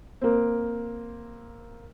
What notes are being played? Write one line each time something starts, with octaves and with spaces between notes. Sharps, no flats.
A#3 C4